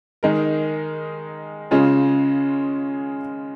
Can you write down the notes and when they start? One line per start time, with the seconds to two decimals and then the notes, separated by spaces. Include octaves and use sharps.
0.23 D#3 G#3 D#4 A#4
1.71 C#3 G#3 C#4 F4